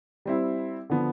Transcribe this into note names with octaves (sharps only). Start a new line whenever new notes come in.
G3 C4 E4
D3 F3 B3